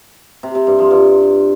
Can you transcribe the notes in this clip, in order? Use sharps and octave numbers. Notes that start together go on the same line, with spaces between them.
C3
C3
G2
F3
G2